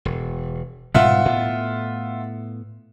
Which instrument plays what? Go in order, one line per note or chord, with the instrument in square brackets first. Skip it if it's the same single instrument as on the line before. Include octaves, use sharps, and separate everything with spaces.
[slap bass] E1
[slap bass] G#2 B2 G3 [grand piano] F4 E5 F#5
[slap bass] A2 B3